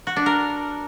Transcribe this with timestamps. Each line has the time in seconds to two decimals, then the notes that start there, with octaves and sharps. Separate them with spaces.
0.07 F#4
0.16 D4
0.26 A#4